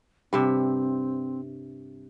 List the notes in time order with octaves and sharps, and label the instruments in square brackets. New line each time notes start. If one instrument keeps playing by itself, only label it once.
[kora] G2 C3 E5 [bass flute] C4